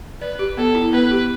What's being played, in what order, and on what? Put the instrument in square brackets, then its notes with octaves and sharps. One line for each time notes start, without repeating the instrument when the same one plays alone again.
[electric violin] B4 [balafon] D5
[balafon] G4
[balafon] B3 [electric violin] A4
[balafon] E4
[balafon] B3 [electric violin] B4
[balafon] G4